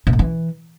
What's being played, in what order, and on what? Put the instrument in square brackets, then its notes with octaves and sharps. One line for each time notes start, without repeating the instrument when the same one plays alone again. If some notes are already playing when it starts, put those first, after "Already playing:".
[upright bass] B2
A2
E3